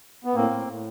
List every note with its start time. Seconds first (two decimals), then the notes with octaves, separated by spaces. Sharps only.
0.24 B3
0.35 A2 A#3 C4
0.51 A2
0.67 A2